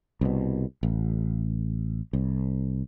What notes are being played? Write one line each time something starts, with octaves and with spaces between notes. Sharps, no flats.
C2 B2
A1
C2